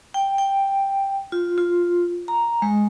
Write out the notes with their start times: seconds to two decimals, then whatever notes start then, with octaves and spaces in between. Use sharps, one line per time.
0.14 G5
0.38 G5
1.32 F4
1.58 F4
2.28 A#5
2.62 G#3